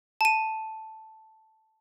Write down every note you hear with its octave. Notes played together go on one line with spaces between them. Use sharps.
A5 D#7